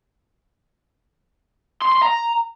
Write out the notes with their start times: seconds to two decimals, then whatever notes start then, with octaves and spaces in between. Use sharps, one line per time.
1.81 C6
1.92 C6
2.02 A#5